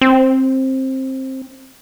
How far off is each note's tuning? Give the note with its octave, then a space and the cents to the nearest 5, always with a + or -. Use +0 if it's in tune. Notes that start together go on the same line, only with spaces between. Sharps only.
C4 +15